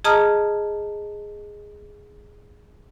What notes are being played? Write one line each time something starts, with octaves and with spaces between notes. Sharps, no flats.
G#4 D#5 A5 A#5 D#6 F6